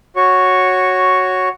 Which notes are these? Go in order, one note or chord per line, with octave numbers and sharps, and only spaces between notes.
F#4 C#5 C#6